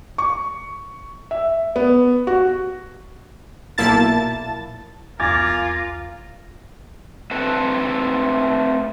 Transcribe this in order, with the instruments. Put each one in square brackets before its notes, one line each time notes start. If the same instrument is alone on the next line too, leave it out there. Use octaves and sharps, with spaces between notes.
[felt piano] C#6
E5
B3
F#4
[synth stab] B1 A#2 A#3 E4 A5 A6
[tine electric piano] B1 E2 G#6 [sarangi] F4 [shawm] A#4 [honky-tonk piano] G#5 D6 A6
[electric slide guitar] A3 C4 A4 B4 A5